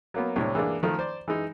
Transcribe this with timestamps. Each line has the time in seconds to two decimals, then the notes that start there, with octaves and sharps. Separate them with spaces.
0.14 F#3 A#3 B3
0.36 C2 A2 D4 C#5
0.55 E3 G#3 A#3 D4
0.83 D#3 F3 A3
0.99 C5 D5
1.28 E3 G#3 D#4